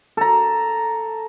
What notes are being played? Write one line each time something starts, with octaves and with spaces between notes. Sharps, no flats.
A4 A#5